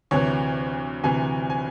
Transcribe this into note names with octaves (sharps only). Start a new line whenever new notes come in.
D2 C3 E3 C#5
D2 C3 E3 G#5
G#5